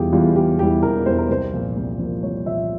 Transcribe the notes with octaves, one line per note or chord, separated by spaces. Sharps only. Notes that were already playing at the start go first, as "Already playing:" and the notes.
Already playing: E1 E2 E3 G3 F4 G4 G#4
E2 E3 G3 F4
E1 G4
E2 E3 G3 G4
E1 A#4
E2 E3 G3 C5
A#4
C2 C5
A#2 F3
C2
A#2 F3
C2 C#5
A#2 F3 E5